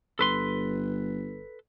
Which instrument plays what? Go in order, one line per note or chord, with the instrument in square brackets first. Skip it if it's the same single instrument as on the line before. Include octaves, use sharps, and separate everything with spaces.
[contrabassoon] G1 [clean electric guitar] A4 B4 C6